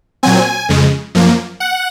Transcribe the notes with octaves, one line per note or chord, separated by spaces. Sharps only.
A#2 F#3 C4 G#5
F2 C#3 G#3
F#2 F3 A#3
F#5